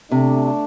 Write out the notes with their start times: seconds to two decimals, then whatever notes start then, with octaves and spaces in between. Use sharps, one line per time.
0.11 C3 A3 D4